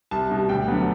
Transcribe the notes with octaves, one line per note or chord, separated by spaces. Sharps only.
C2 A5
B2 G3
D2 G5
D3 F#3 B3